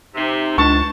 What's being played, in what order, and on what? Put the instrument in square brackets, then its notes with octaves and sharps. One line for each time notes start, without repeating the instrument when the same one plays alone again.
[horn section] C3 [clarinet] D#4
[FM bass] C#2 [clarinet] D4 [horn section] A5 [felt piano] C#6